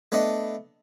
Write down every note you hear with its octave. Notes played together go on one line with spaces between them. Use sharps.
A3 B3 D4 B4 D#5